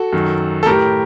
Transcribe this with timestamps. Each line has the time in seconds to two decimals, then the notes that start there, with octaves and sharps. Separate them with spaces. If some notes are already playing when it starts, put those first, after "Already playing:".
Already playing: F#4 A4
0.13 F#2 D#3
0.63 A4
0.66 A2 G4 A#4